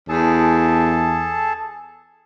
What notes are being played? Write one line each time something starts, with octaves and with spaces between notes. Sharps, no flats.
E2 G#4 A4 A5